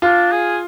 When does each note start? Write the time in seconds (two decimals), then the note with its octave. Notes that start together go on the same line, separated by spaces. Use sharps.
0.02 D4 F4
0.32 G#4